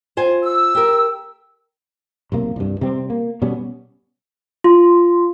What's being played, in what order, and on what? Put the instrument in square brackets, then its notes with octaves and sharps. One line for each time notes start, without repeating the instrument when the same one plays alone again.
[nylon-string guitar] F4 C5 G#5
[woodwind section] E6
[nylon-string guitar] G4 A#4
[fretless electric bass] B1 C3 A#3
C2 G2
C3 G3 C4
A#3
B2 G3 B3 C#4
[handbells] F4